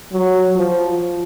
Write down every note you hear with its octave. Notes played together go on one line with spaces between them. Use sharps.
F#3
F3